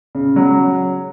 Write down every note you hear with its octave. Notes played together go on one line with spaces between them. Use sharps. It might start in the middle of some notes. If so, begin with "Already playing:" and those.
C#3
F#3